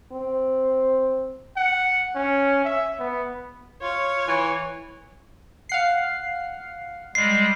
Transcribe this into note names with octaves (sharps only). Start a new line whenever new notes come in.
C4
F#5
C#4
E5
B3
F4 C#5
E3
F5 F#5 C7
G3 G#3 C7